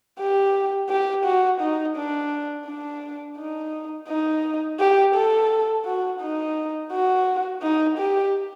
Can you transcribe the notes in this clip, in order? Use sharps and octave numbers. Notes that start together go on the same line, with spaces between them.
G4
G4
F#4
D#4
D4
D4
D#4
D#4
G4
A4
F#4
D#4
F#4
D#4
G4